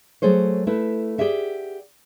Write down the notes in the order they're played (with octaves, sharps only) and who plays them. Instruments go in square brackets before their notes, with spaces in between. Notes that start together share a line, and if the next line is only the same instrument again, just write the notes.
[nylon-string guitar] F#3 A3 G#4 C5 C#5
A3 E4 B4
G4 G#4 D5 E5 F#5